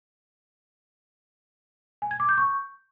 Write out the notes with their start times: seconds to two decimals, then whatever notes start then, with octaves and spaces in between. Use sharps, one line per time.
2.02 G#5
2.11 G#6
2.20 D6
2.29 G6
2.37 C#6